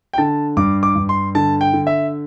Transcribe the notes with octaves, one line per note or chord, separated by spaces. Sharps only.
G5
D3 A5
G2 D6
D6
G2
C6
D3 A5
G5
D3
E5